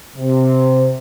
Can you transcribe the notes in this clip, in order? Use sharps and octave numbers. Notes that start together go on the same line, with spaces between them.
C3